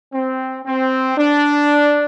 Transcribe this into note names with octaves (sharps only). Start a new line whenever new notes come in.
C4
C4
D4